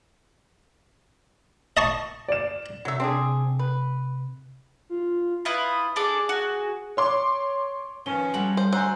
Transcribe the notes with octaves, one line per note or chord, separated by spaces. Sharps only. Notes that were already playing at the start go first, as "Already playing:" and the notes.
D#5 A5 C#6
D5 E7
C3 F#3 E5
C4 D4 G#4
B4
F4
E4 F4 B4 D#6
D4 G#4 A4 D6
F#4
C#5 C6 D6
D#3 F3 C#4 B4 G7
G3 F#4 A4 F#7
C5 C#5
D2 F#3 C5 F#5 G#5 A#5 E6